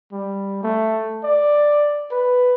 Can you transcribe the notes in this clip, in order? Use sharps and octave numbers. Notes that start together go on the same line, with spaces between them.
G3
A3
D5
B4